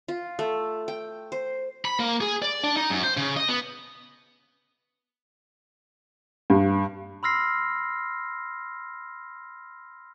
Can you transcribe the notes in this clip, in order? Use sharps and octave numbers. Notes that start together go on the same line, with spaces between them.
F4
A3
G5
C5
B5
A#3
G#4
D5
D4
D#4
F#2
C5
C#3
D#5
B3
G2
B5 C6 E6 F6 A#6 C7